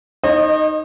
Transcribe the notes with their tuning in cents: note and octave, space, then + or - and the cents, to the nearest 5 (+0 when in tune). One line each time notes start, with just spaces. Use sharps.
D#4 +0 C5 +45 D#5 -25